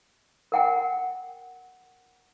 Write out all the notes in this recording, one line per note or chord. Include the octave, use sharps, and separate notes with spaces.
A#4 F#5 G5